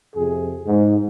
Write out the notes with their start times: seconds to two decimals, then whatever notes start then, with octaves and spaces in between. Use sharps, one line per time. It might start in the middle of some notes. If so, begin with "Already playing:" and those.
0.16 F2 C3 G#4
0.67 G#2